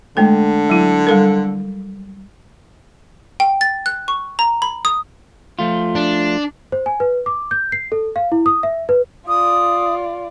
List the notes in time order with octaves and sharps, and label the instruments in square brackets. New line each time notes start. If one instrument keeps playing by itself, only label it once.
[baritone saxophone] D3 [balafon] G#3 A3 A4
[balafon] F#3 E4
G3 A4 A#4
[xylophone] G5
A6
F#6
C#6
A#5
B5
D#6
[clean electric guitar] F3 A3 F4
[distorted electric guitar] D4
[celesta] C5
G#5
B4
D6
G6
C7
A4
F5
E4
D#6
E5
B4
[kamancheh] F4 D5 [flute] D#6